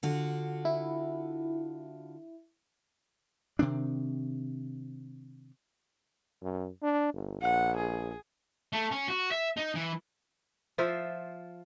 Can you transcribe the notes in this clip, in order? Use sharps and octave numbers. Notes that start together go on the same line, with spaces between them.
D3 F4 F#4
E4
C3 D#3 C4 D4
F#2
D4
G1
A#1 F#5
G#4
A3
C#4
F#4
E5
D#4
E3
F3 F4 C5 E5